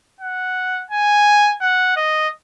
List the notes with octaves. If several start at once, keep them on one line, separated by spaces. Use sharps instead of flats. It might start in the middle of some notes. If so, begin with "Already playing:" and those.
F#5
G#5
F#5
D#5